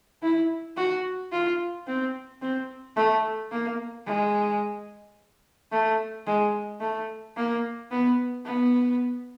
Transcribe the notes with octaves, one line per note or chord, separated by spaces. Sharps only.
E4
F#4
F4
C4
C4
A3
A#3
G#3
A3
G#3
A3
A#3
B3
B3